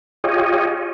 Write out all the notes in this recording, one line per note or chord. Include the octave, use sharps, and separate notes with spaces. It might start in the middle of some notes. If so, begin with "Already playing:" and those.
F4 G4 G#4 C#5 D#5